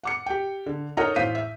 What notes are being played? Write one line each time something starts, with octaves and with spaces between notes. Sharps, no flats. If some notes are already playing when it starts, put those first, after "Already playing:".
F#5 D6 C#7
G4 G5
D3
D#4 F#4 A4 A#4 C#5 D#5
A1 C5 F5 G6 B6 D#7
E5